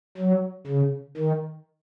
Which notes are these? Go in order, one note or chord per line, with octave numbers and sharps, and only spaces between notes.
F#3
C#3
D#3